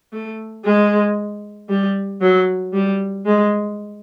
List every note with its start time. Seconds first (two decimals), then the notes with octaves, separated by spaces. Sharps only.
0.12 A3
0.65 G#3
1.69 G3
2.21 F#3
2.73 G3
3.26 G#3